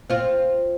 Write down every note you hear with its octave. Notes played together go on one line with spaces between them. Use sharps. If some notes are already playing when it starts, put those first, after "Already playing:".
C4 F4